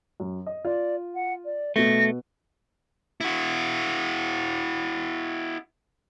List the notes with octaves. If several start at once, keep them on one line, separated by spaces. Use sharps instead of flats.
F#2
D#5
F4 D5
F#5
D5
B2 A3 B3 A#6
E4 F#4